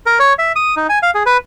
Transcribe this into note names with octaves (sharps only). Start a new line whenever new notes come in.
A#4
C#5
E5
D#6
D#4
G#5
F5
G#4
B4